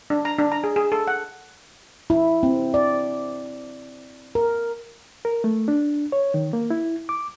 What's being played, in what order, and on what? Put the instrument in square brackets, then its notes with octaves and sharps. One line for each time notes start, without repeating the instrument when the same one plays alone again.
[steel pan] D4
A#5
D4
A#5
G#4
G#4
A4
F#5
[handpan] E4
C4
D5
A#4
[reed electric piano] A#4
A3
D4
C#5
D#3
A#3
E4
D6